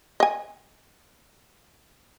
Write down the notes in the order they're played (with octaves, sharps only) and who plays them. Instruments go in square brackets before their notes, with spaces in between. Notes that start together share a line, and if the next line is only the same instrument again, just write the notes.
[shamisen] D#5 G#5